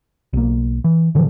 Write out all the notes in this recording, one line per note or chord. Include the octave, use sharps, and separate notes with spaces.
B1 A#3
E3
A2 D3 E3 F3